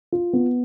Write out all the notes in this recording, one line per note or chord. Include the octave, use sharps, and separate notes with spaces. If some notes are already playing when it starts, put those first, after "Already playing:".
F4
B3